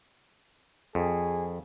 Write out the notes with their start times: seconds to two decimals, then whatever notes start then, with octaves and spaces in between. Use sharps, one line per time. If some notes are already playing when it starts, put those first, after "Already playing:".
0.95 F2 G#4